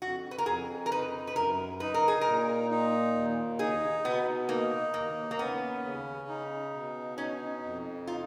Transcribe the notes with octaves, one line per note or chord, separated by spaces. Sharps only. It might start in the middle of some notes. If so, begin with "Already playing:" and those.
F2 F#4
B4
A#4
F2 G#4
A#4
D#4 B4
B4
F#2 A#4
D#4 B4
A#4
G#4
A#2 A#4
D#4
D#2
D#4 G#4
B2 B3
A#3 D#4
D#2 A#3
A#3
B3 C#4
C#3
D#4
B2
C#4 D#4
F2
D#4 F4